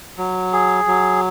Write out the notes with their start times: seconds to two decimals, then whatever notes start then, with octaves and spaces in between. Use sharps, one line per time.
0.18 F#3
0.53 G#4
0.87 F#3